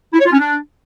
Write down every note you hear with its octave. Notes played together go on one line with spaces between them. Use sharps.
E4
C#5
F4
C#4
D4